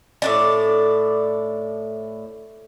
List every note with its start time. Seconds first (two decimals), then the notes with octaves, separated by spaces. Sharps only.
0.22 A2 D4 D5